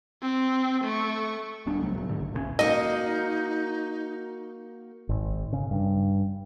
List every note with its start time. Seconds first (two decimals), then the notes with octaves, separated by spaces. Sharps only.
0.22 C4
0.84 A3 C#6
1.66 D#1 G3 B3 D4
1.81 C#2 C#3 F#3 A3
1.95 A#2 F#3
2.09 G#2 D3
2.20 A#1
2.33 D#1 A#2 G3 C#4
2.59 A#3 D#4 F#4 D#5
5.09 G#1
5.53 C#3
5.71 G2